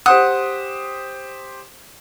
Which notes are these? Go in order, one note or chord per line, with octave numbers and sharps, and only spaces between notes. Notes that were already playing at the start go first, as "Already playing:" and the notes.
G4 C5 F#5 D#6